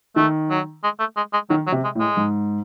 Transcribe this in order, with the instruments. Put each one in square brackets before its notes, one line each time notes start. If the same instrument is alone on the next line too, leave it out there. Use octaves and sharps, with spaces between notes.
[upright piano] D#3 [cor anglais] A3
[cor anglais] F#3
G#3
A3
G#3
G#3
[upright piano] D#3 [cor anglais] F#3
[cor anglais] F#3
[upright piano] C3
[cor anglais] G#3
[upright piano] A2
[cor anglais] G#3
[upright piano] G#2